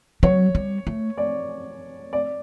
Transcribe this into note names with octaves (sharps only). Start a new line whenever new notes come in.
F#3 C#5
G3
A3
D5
D5